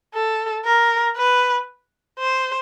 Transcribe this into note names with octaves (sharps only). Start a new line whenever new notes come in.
A4
A#4
B4
C5